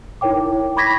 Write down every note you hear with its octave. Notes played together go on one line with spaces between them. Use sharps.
D#4 E4 A#4 C#5 G5 D6
B5 C#6 D6 G#6 A#6 B6